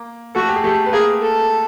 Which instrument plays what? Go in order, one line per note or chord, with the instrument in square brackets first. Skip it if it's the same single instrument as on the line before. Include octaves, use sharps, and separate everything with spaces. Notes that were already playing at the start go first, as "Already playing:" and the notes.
Already playing: [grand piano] A#3
[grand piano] A3 A4 [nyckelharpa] F#4
[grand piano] G4
G#4
[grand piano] A3 A4 [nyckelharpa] G4
[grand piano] B4
[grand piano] A#3 A#4 [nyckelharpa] G#4
[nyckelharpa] A4